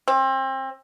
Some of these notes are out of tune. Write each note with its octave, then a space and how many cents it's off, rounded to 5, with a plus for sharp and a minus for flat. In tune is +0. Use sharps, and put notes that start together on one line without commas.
C4 +30